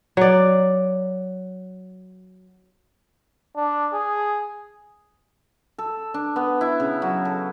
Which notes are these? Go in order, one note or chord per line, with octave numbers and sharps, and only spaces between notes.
F#3 D5
D4
G#4
A4
D4
B3
E4
C#3
F#3
A4